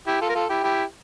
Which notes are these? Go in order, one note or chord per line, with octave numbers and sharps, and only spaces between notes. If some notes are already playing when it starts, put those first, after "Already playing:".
E4 G4
F4 A4
A#4
F4 A4
E4 G4
E4 G4